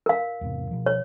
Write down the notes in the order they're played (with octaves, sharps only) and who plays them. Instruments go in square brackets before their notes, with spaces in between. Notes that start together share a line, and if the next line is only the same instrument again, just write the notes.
[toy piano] A#4 F5
[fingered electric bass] E2 G#2 C3
B2 F3
[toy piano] C#5